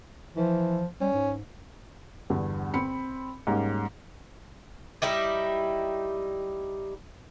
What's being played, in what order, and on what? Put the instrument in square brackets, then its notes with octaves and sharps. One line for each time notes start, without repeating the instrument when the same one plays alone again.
[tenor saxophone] E3 [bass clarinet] F3
[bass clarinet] G3 [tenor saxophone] C#4
[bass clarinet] G#2
[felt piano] E2 G2 D3
C4 B5 C#7
G#2 G3 A#3 C#4
[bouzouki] G3 D#4 E4 G4